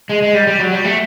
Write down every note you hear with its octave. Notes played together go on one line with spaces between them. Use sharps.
G#3
G#3
G3
G3
F#3
G3
A3